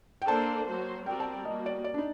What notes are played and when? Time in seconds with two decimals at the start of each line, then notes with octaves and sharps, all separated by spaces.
0.22 G5
0.28 A#3 D4 A4 C5 A5
0.67 F#3 A#3 F#4 C5
1.06 G3 C4 F#4 A#4 D5 G5
1.20 A5
1.45 G3 A#3 F#4 D#5
1.66 D5
1.84 D5
1.94 D4
1.98 D#4